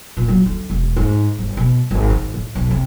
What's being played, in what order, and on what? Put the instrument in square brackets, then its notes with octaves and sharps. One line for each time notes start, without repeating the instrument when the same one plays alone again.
[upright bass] A#2
F#3
D3
E1
G#2
G1
B2
G#1
D#3
A2
B1
C3